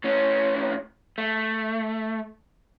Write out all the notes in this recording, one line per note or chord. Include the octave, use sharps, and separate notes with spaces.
A2 C#4
A3